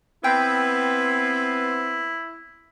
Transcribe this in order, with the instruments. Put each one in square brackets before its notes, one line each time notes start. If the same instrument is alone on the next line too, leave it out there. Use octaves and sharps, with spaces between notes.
[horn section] B3 C4 [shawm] E4 [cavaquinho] G5